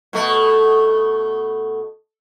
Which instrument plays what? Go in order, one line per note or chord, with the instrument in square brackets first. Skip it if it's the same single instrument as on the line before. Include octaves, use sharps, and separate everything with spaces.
[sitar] B2 A3